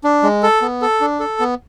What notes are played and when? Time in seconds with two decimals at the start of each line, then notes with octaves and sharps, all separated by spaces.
0.04 D4
0.23 G#3
0.43 A4
0.62 B3
0.82 A4
1.01 D4
1.20 A4
1.40 B3